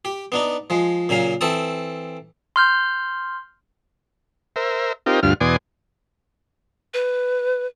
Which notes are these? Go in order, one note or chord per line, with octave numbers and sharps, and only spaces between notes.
G4
B3 D4 D#4
F3 G#3
A#2 C#3 F#3 F5
E3 C4 A4 A5 D#6
C6 F6 G6
A#4 C5 E5
C4 D#4 F4 G4 A#4
D2 G2 F4 F6
E2 B2 D5 G#5 C6 D#6
B4